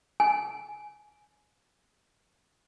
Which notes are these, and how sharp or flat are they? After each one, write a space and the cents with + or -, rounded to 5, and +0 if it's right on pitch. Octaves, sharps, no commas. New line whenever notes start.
G#5 +15